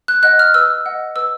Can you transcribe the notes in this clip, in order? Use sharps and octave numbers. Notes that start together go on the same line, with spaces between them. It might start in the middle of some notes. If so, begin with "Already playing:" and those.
F#6
D#5 F#5 F#6
F6
B4 E6
D#5 F#5
B4 E6